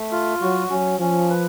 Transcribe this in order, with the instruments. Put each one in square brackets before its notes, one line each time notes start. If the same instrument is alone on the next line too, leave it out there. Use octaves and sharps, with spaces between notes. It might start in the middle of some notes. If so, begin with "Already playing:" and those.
Already playing: [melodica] A3
F4
[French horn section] F#3 [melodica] F#4
[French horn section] F#3 [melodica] C#4
[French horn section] F3 [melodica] C#4
[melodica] B4